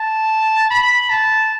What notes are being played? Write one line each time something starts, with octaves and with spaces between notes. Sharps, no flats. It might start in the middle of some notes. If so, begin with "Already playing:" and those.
Already playing: A5
B5
A5